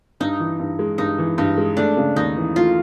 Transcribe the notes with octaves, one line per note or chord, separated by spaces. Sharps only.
G2 D#4
E3
G2
G#3
G2 D#4
E3
G2 D#4
G#3
A3 D4
C#3
D#2 D#4
E3
A3 F4